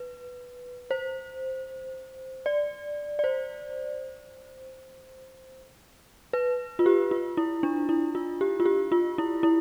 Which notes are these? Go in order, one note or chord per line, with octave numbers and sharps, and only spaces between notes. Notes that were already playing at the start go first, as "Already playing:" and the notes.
Already playing: B4
C5
D5
D5
C5
B4
F4
G4
F4
E4
D4
E4
F4
G4
F4
G4
F4
E4
E4